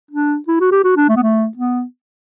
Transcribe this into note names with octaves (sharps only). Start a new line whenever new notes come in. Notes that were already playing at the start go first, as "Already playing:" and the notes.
D4
E4
F#4
G4
F#4
D4
A3
B3
A3
B3